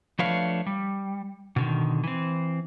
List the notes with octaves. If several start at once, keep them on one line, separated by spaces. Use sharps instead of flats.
F3 A3 D4 B4 C#5 F5
G3
B2 D3 D#3
E3 C4